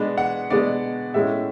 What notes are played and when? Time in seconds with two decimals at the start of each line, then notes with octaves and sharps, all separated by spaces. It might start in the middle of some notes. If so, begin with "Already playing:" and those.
Already playing: B2 G#3 B3 D4
0.18 F#5
0.50 B2 G#3 B3 D4 D5
1.14 A2 G#3 C#4 E5